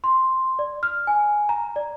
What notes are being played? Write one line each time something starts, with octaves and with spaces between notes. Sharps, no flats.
C6
D5
F6
G#5
A#5
D5